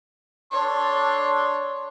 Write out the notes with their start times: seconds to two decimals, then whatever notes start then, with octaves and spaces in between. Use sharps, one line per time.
0.52 D4 A4 C#5 C6